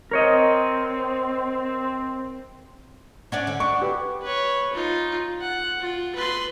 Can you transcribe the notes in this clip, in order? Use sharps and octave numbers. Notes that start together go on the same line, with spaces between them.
C4 A#4 C#5 D#5
C#4 D4 D5 F#5
D3
D4 C#6
G4 B4
B4 C#5
D#4 F4
F#5
F4
B4 C6